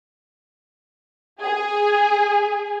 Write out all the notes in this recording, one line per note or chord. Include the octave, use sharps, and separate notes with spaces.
G#4